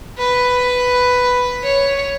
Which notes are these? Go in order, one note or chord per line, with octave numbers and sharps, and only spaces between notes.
B4
C#5